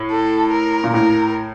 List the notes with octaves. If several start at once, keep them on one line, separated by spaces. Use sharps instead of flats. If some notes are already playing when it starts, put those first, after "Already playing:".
Already playing: A2
A4
A#4
A#2
A2 A#4